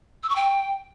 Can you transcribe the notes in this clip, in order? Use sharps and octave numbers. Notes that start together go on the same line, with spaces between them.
E6
C#6
G5